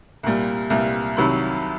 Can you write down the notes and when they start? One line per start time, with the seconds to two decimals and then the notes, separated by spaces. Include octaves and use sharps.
0.23 C2 A#2 G3
0.70 C2 A#2 G3
1.17 C2 C3 D#3 F#3 B5